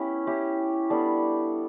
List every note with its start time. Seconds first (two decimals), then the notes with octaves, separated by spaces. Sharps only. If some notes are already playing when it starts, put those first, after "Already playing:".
Already playing: B3 C#4 E4 G4
0.27 C#4 E4 G4
0.90 G3 B3 D4 A4